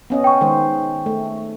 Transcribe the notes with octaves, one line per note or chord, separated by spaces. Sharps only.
B3 C#4 D#5
G5 C#6
D#3 G#3 C5
A3